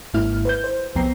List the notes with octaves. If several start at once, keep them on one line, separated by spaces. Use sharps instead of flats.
G#1 G#2 A#3 E4 F6
B4 G6
C5
C2 F2 B3 G5 A#5 C7